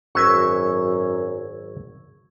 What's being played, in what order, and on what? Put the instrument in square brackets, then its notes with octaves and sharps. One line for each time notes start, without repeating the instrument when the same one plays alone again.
[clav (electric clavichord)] G#1 F#3 B4 [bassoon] F#2 [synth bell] C#6 E6 G#6